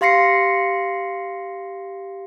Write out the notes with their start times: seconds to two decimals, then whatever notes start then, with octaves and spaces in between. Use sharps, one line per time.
0.01 G4 F5 C6 A#6 C7 C#7